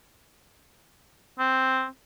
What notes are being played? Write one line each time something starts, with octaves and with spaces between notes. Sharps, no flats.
C4